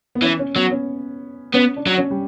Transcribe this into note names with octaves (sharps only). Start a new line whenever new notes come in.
B3
E3 C#4
C#4
F#3 B3
C#4
B3 C#4
D4
F#3
C#4
G3